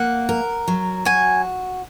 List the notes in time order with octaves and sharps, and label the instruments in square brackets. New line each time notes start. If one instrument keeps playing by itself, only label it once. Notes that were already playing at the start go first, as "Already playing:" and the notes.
Already playing: [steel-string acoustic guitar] A#3 [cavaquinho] F#5
[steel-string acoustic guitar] A#4
F#3
[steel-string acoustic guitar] F#4 [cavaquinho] G#5